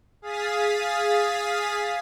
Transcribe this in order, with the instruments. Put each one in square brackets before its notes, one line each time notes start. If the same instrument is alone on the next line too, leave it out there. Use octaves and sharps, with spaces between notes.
[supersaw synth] G#4 F5 D#6 A6 B6